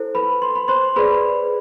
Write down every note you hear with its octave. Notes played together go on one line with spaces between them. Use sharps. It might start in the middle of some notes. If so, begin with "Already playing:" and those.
Already playing: E4 A4 C5
B4 B5
C6
B5
C5 C6
G#4 B4 D5 B5